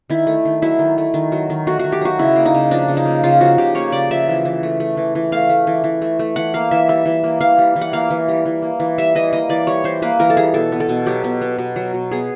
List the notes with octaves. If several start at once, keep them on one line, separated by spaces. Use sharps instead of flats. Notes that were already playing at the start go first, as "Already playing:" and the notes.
D#3 E4
A3
D#3
F#3 E4
D#3
A3
D#3
F#3
D#3
A3 F#4
D#3 F#4
G4
F#3 F#4
C#3 E4
A#3
D#4
C#3
F3 D4
C#3
D#4
A#3
C#3 F4
F3 F#4
C#3 G4
A#3 C#5
C#3 D5
F3 E5
E3
E3
A3
A3
E3
E3
A3 F5
A3
E3
E3
A3
A3
E3 F#5
A#3 F5
E3 E5
G3 E5
E3
A#3
E3 F5
G3
E3
F#5
A#3 F5
E3
G3
E3
A#3
E3
G3 E5
E3 D#5
A#3 D#5
E3 D5
G3 C#5
E3 C5
A#3 B4
E3 A#4
A4
G3 G#4
B2 A4
B3
A4
B2
F#3 G4
B2
B3
B2
F#3
B2
B3 G#4